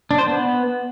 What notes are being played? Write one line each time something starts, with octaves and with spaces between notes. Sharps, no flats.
D4
C5
B3